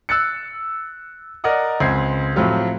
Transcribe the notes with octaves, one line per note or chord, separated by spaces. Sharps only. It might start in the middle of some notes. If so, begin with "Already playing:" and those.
E6 F#6 A6 C#7
A#4 D5 D#5 F#5 D#6
C#2 C4 G#6 C7
A2 F3 F#3 C4 F4 G4